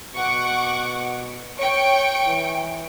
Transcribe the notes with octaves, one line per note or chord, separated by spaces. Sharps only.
B2 F#5 C#6 D6
C#5 G5 C#6 D7
E3